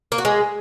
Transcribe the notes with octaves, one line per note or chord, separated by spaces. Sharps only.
A#3
F#4
G#3